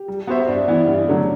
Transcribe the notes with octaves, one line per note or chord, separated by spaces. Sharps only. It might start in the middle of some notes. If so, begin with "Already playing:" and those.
Already playing: G4
G3
B3 F#4 C5 E5
G2 D4
E3 B3 E4
G2
D3 F#3 A3